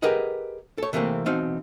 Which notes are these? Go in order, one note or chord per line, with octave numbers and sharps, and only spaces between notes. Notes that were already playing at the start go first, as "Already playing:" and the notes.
G4 G#4 A#4 B4 D#5 F#5
A4 C#5
C3 E3 A3 A#3 C4
B2 E3 C4 D#4 F5